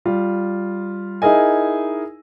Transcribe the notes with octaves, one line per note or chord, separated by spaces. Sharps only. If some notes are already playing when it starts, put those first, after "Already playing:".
G3 F4
D#4 E4 G#4 A#4 D#5 G#5